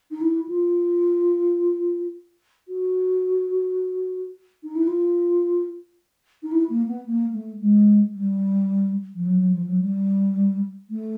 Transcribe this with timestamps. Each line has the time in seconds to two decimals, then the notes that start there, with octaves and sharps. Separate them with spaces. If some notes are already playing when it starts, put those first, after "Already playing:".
0.11 D#4
0.21 E4
0.48 F4
2.68 F#4
4.63 D#4
4.75 E4
4.87 F4
6.43 D#4
6.51 E4
6.70 A#3
6.88 B3
7.06 A#3
7.33 A3
7.61 G#3
8.15 G3
9.15 F3
9.25 F#3
9.38 F#3
9.52 F3
9.66 F#3
9.80 G3
10.90 A3